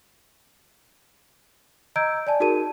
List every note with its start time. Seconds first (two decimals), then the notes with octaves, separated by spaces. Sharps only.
1.96 D#5 A#5 E6 G6 G#6 D7
2.27 D5 G#5 A5
2.40 D#4 F#4 G#4 A#4 A5 D#7